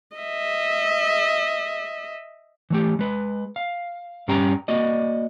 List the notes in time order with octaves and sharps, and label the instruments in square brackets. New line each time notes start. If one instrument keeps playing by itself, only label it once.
[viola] D#5 E5
[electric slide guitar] E3 A3 G4
G#3 B4
F5
G2 G3 C#4 G4 G5 A#5
A#3 F#4 D5 D#5